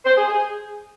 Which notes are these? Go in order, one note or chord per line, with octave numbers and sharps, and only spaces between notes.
C5
G#4
G#4